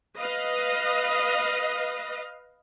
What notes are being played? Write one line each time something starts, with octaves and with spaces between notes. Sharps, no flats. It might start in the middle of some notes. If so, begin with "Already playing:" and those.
B4 D#5 F5